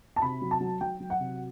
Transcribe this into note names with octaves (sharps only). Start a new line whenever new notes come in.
A5
C3 B5
F#3
A5
F#3
F#3 G5
F#3
F#5
C3